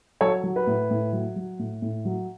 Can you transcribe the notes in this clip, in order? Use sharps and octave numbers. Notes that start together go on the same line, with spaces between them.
F#3 A4 C#5
F#3
B4
A2
A2
F#3
F#3
A2
A2
F#3